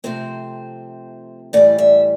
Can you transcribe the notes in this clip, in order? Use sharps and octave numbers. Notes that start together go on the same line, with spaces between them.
C3 F3 A3 C4 C5
A2 E3 G3 D5
E5